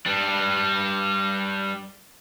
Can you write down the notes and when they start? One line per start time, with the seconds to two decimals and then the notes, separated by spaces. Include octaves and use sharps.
0.06 G3 D4